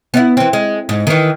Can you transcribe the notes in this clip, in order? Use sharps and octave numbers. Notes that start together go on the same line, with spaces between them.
B3 D#4 E4
E3 C4
G#3
G#2
D#3 E3